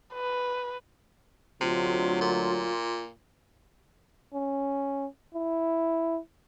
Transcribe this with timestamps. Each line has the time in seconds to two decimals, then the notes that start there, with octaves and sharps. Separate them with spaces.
0.14 B4
1.61 D2 C3 F#3 F4
2.21 A#2
4.34 C#4
5.34 E4